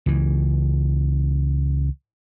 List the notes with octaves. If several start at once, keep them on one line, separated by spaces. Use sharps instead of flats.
C#2 E3